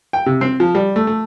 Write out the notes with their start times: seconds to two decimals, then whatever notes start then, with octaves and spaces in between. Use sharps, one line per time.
0.13 G5
0.26 C3
0.41 C4
0.60 F3
0.75 G3
0.96 A3
1.07 A3